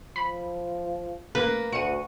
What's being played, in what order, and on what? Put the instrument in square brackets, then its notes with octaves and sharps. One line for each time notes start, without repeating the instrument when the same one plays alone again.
[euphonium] F3 [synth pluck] B5
[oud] A#3 [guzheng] B4
[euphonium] D2 [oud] F#4 [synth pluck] C#7 D#7